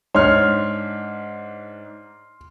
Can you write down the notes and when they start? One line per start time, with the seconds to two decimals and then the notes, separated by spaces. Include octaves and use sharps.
0.15 G#2 D4 C#5 C6 F6